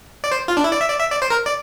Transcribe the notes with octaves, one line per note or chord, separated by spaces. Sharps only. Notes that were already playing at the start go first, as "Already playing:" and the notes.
D5
C5
F4
D4
E4
D5
E5
D5
E5
D5
C5
A#4
D5